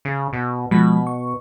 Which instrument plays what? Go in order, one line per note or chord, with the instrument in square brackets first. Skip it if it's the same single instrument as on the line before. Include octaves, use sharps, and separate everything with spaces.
[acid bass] C#3
B2
[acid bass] B2 [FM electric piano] F3 G#3 B5
[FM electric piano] C#6